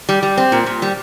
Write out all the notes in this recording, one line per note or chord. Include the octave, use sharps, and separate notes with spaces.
G3
G3
C4
A#2
A#2
G3